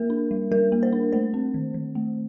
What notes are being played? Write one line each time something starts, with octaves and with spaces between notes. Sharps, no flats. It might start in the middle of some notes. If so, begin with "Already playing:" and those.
Already playing: A#3 A#4
D4
G3
G3 A#4
A#3
C5
D4
A3 C5
C4
D#3
D#3
A3